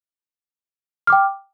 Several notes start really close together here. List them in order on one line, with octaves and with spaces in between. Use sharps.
F6 D6 G5